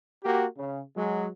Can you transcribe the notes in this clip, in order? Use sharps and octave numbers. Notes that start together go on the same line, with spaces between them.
A#3 F#4 G4
C#3
F#3 G#3